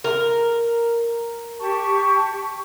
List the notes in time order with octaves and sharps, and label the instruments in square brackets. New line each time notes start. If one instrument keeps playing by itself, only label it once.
[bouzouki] A#4
[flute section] G4 A5 C#6